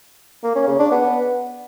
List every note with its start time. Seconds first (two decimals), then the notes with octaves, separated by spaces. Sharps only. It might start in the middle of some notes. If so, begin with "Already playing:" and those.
0.44 A#3
0.56 C#4
0.67 C#3
0.79 D4
0.91 B3